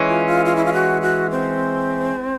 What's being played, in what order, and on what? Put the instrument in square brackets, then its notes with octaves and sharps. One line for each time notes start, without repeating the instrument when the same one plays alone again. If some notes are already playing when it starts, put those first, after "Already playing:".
Already playing: [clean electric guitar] E3 G#3 C#4
[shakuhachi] F4
F4
F4
E4
F4
F#4
F#4
C4